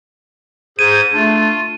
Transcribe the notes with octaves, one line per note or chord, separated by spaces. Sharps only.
G#2 G#4 C5 G#6 D#7
A3 D4 F4